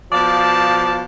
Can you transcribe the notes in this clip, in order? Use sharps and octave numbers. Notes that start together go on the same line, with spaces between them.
B2 F3 D5 F5 A5